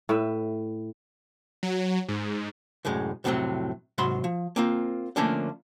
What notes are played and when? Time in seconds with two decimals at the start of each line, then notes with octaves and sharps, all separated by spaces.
0.09 A2 B4 E5
1.63 F#3
2.08 G#2
2.85 C2 F#2 A2 G#3
3.24 F2 A2 C3 E3 F#3 C4
3.98 G#2 C3 F#3 C5 B5 C6
4.24 F3
4.56 A#3 C4 F4
5.16 D3 F3 A3 A#3 C#4 D4